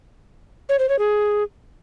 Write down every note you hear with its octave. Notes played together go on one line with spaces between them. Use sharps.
C#5
C5
C#5
G#4